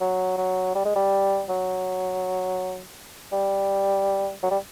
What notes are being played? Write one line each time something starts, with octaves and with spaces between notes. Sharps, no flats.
F#3
F#3
G3
G#3
G3
F#3
G3
F#3
G3